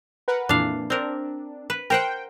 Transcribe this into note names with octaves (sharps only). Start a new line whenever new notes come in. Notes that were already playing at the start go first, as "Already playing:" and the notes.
A#4 B4 F#5
F2 A#2 E3 D4 F5
C4 D4 A#4
B4
A#4 C5 F#5 G5